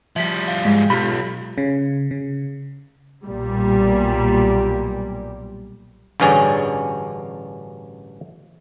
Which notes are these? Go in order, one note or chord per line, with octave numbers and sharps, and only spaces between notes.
F3 G3 E5 B6
F5
G#2
B1 F4 G4 B5
C#3
C#3
B1 A#2 G3
A1 D2 G2 C#4 G#4 D5